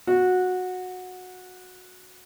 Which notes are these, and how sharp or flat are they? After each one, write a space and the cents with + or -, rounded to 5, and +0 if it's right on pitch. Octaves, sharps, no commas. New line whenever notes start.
F#4 -15